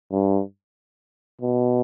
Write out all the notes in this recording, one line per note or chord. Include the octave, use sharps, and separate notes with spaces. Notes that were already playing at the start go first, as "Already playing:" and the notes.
G2
B2